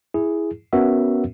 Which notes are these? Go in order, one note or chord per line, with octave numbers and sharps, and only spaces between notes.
E4 G#4
B3 C#4 F#4 A#4 C#5 E5